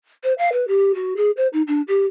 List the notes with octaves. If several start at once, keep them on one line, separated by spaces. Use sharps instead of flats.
C5
F5
B4
G4
F#4
G#4
C5
D#4
D4
G4